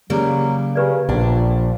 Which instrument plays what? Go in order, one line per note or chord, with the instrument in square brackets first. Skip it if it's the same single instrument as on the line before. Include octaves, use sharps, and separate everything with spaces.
[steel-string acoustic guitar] C#3 G3 A#3 [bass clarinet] F#3
[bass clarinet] C#3 [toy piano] G4 B4 D5
[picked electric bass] A#1 [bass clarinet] A#2 [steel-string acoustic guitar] D4